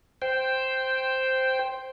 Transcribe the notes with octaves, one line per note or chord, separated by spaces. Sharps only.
C5 G5